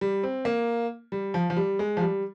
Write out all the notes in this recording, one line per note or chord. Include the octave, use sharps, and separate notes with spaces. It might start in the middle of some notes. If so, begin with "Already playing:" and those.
G3
C4
A#3
G3
F3
F3
G3
G#3
F3
G3